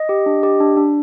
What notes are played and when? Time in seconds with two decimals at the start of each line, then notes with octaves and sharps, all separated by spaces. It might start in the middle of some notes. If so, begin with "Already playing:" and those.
Already playing: D#5
0.09 G4
0.26 D4
0.43 G4
0.60 D4
0.77 D4